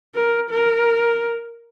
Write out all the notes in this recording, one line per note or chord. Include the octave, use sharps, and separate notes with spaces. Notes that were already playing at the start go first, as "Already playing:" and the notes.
A#4
A#4